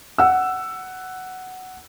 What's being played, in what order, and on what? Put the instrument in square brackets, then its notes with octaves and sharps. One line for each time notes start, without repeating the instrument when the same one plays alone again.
[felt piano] F#5 E6